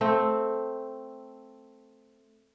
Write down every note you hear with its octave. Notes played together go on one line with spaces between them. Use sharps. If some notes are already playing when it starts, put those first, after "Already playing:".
A3 C4